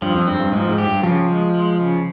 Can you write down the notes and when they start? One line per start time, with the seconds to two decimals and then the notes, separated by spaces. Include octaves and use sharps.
0.02 G2 F3
0.15 F2
0.27 G2 C4
0.40 G2
0.52 G#2 F3
0.69 G#2
0.78 G4
0.87 G2
1.03 C#3 F3
1.29 G#3
1.54 G#3
1.79 C#3